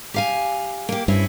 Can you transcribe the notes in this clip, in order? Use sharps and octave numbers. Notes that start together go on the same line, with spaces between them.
G4 F5 G#5
A#3 G4
G2 C4 C#4 E4